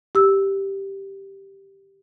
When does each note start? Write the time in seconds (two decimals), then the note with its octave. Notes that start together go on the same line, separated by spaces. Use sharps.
0.15 G4 E6